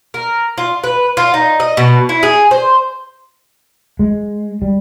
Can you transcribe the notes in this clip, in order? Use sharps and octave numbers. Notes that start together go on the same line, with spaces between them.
A#4
F4
B4
F4
D#4
D#5
B2
E4
G#4
C5
G#3
G3